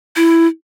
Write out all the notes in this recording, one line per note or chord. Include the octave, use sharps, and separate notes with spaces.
E4